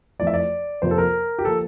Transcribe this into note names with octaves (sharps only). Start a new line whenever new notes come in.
F2 E3 A3 D5
E5
D5
F2 C3 F3 A#3 C5
A4
A#4
G4
F3 A#3 A4